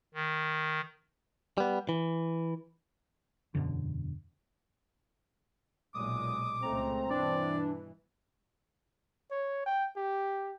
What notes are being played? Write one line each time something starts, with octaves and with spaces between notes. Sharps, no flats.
D#3
G3 B3
E3
E1 F#2 B2 D3
B1 A#2 G#3 D6 D#6
C#2 G#3 A3 C4 A#5
G2 B2 E3 D4 D5
C#5
G5
G4